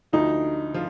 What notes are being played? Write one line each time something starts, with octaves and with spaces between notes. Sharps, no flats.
D2 D3 F3 D#4
F3 F4